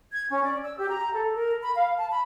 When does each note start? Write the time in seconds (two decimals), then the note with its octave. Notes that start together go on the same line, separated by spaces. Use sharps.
0.11 G#6
0.29 C#4
0.44 D5
0.63 E6
0.77 G4
0.90 A#5
1.12 A4
1.33 A#4
1.62 B5
1.76 F5
1.98 A5
2.10 B5